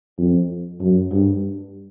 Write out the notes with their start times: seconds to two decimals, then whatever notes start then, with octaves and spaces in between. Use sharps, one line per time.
0.18 F2
0.81 F#2
1.11 G2